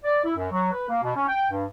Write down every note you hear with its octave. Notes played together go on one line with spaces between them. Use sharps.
D5
E4
F#2
F#3
B4
A#3
B2
C#4
G5
G2